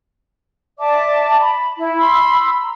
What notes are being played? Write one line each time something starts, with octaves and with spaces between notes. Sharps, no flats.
D5 E5 A5 D6
B5
E4
B5 C6 E6
A#5